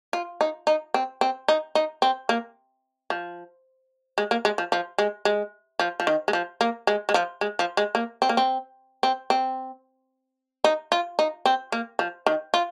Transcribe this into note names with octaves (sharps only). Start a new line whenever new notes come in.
F4
D#4
D#4
C4
C4
D#4
D#4
C4
A#3
F3
G#3
A#3
G#3
F3
F3
G#3
G#3
F3
F3
D#3
G#3
F3
A#3
G#3
G#3
F3
G#3
F3
G#3
A#3
C4
A#3
C4
C4
C4
D#4
F4
D#4
C4
A#3
F3
D#3
F4